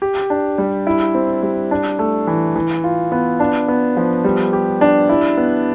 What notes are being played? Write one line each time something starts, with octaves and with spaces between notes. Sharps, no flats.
G4
D4
G3
E4
C4
G3
D4
A3
E3
E3
F4
B3
D4
B3
F3
G3
G4
D4
E4
B3